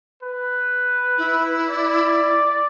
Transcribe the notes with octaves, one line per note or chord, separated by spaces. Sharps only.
B4
E4
D5